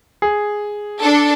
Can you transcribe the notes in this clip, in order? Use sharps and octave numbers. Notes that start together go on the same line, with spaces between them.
G#4
D4 A4